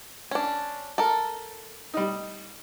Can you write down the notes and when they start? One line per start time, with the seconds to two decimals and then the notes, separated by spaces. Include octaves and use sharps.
0.31 C#4 D4
0.98 A4 A#4
1.94 G3 D#4